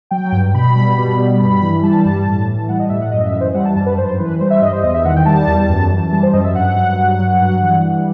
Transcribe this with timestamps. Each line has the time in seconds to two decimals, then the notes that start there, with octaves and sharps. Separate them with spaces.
0.11 F#3 G5
0.32 G2
0.54 B2 B5
0.75 G3
0.97 B2
1.18 G3
1.40 G2 B5
1.62 E3
1.83 G3 A5
2.05 G2
2.26 A2
2.48 E3
2.69 G3 F#5
2.79 D#5
2.89 A2 E5
3.01 F#5
3.11 F#2 D#5
3.26 E5
3.33 E3
3.41 C5
3.54 G3 F#5
3.65 A5
3.76 F#2 A5
3.86 B4
3.98 G2 C5
4.19 E3 B4
4.40 G3 C5
4.50 E5
4.61 G2 D#5
4.72 C5
4.83 E2 D#5
4.94 E5
5.05 D#3 F#5
5.16 G5
5.26 G3 A5
5.47 E2
5.69 F#2
5.91 E3
6.12 G3 A5
6.23 C5
6.33 F#2 D#5
6.44 E5
6.55 G2 F#5
6.76 F#3
6.98 G2
7.19 F#3
7.41 G2
7.62 E3
7.84 G3